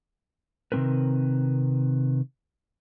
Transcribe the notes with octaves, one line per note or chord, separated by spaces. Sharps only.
C3 D#3 F#3 C4 A#4 B4